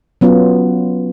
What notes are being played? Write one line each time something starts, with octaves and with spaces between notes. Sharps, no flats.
F#3 B3 C#4 F4